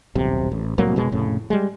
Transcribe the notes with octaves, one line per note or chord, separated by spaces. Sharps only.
D#1 B1 C3
A1
C2 A2 F#3 A#3
F1 B2 G#3
F1 A2 C#3
G3 G#3